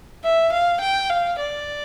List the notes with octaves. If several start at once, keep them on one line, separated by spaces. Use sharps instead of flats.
E5
F5
G5
F5
D5